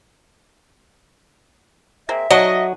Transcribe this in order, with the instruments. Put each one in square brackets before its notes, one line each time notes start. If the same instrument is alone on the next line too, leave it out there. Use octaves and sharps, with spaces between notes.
[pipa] G#3 A#3 C4 [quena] E5
[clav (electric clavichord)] F#3 [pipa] A3 D#4 F#4 [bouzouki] D#5